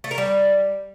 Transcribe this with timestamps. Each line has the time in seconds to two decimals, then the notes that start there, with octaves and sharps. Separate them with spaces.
0.04 A3
0.11 A#4
0.18 G3